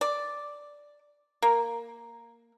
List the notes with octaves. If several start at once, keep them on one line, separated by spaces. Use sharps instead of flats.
D5
A#3